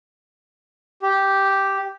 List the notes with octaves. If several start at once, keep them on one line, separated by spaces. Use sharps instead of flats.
G4